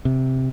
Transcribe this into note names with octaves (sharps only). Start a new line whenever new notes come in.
C3